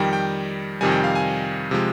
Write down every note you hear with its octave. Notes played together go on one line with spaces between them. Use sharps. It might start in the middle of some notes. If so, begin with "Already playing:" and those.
Already playing: F2 D#3 G3 G5
G5
F2 C3 D#3 G3 G#5
G5
F5
G#5
C3 F3 G#3